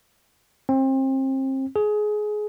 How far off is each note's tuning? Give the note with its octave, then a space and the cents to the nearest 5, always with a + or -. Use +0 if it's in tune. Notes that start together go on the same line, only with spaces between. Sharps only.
C4 +30
G#4 +20